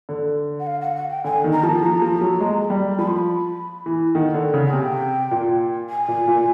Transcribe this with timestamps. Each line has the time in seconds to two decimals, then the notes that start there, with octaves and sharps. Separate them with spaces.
0.09 D3
0.60 F#5
0.67 F5
0.81 F#5
0.96 F#5
1.10 G5
1.24 D3 G#5
1.44 D#3
1.53 A#5
1.63 F3 A5
1.83 F3 A#5
2.02 F3
2.21 F#3
2.40 G#3
2.70 G3
2.99 F3 B5
3.07 C6
3.15 B5
3.86 E3
4.15 D#3 F#5
4.34 D3
4.54 C#3
4.66 F#5
4.73 C3 G5
5.31 A#2
5.90 G#5
6.08 A#2
6.28 A#2